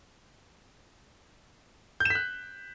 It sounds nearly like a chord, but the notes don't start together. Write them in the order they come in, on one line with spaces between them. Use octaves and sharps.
G6 E7 B6 F#6